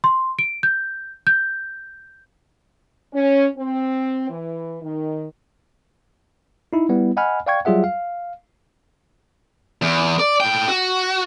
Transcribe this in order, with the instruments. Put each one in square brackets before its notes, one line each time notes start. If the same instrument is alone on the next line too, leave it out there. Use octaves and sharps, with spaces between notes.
[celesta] C6
D7
G6
G6
[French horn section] C#4
C4
E3
D#3
[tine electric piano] D#4 E4
G3 B3 E4
D#5 F#5 G#5 B5 F6
D5 F5 G5 C#6 G#6
F#3 G3 F4 G#4 E5 F#5
F5
[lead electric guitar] E2
D5
A2 G5
F#4